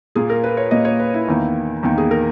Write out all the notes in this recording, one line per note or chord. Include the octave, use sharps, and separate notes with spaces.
A#2 A#3 G#4
A#4
B4
C#5
A#2 A#3 D#5
C#5
B4
E4
E2 D#3 A#3
E2 D#3 A#3
G#4
A#4